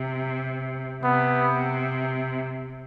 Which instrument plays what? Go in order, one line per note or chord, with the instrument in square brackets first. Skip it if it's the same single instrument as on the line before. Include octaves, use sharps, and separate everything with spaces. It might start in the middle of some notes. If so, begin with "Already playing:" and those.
Already playing: [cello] C3
[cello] C3 [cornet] B3